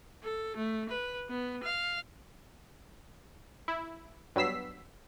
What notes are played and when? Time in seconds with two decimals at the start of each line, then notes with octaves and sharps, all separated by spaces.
0.23 A4
0.56 A3
0.89 B4
1.29 B3
1.63 F5
3.68 E4
4.36 G2 F#3 B3 E6 B6 C7